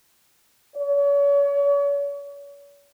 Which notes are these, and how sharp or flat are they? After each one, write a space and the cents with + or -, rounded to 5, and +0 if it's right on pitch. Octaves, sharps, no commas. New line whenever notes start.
C#5 +40